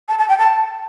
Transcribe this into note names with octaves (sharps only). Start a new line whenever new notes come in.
A5
A5
G5
A5